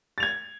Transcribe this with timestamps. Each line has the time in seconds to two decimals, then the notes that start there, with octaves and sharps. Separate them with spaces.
0.18 A6
0.20 F7
0.23 G#6